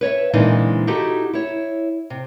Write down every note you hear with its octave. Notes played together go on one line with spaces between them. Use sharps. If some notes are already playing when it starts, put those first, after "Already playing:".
B4 C#5 D5 E5
A#2 D3 E3 G#3 C4 D#4
D#4 E4 F#4 G4 A4
E4 C#5
C3